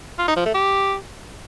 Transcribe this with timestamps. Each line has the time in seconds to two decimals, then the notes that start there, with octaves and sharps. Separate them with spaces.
0.19 F4
0.28 D#4
0.37 F3
0.46 A3
0.55 G4